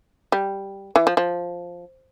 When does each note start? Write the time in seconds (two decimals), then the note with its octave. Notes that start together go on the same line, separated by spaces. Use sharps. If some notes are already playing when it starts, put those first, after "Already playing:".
0.32 G3
0.96 E3
1.07 F3
1.17 F3